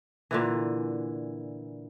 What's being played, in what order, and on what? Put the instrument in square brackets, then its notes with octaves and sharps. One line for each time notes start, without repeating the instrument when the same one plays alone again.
[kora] A#2 D3 E3